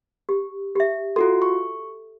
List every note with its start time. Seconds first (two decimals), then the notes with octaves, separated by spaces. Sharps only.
0.29 G4
0.76 G4 E5
1.16 F4 F#4 A4 C6
1.42 C#6